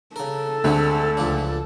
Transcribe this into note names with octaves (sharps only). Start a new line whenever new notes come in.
C#3 A4 A#4
D2 D3 G#3 C4
C#2 F3 D4